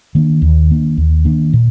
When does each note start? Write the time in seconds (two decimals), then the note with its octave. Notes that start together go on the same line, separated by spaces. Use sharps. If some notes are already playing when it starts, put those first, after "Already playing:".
0.15 D#3 A#3 D4
0.42 D#2
0.70 D#3 A#3 D4
0.97 D#2
1.25 D#3 A#3 D4
1.53 A#2